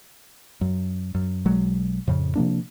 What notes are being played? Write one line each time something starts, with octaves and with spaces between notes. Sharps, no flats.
F#2
F#2
B1 F#3 G#3
F2 A2 C#3
C3 F3 A#3 D4